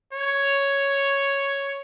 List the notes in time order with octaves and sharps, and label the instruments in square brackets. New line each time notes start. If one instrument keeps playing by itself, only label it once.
[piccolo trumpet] C#5